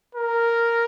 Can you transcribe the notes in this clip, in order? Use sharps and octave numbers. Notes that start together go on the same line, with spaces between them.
A#4